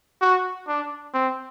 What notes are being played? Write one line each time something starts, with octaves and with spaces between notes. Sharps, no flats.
F#4
D4
C4